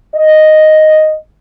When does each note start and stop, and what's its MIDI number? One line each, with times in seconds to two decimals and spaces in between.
0.15 1.14 75